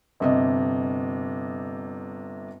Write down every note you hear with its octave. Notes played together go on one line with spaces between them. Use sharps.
G1 C3 D#5